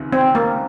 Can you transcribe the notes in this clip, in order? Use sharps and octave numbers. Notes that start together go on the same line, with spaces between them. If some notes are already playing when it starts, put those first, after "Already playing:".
Already playing: C#2 C3 D#3
C4
A#3